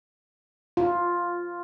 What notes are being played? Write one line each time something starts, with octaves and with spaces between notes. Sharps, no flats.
F4